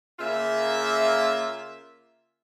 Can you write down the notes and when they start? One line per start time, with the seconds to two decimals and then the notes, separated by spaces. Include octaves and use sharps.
0.19 C#3 A#3 F4 E5